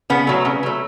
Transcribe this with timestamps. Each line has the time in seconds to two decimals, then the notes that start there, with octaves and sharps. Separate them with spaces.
0.10 C#3 B3
0.27 F#3 A3
0.45 C#3
0.63 F#3 A3